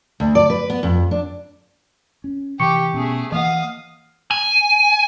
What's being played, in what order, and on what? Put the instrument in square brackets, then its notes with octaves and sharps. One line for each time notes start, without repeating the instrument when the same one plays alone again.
[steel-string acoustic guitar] D2
D5
B4
B3
F2
D4
[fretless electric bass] C#4
[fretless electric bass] C3 E3 [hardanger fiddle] G4 [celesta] C#6 C#7
[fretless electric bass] B2 B3 C#4 [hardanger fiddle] A3 G#4
[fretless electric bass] E3 A#3 [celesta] D#5 F#5 [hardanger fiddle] F5 D#6
[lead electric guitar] G#5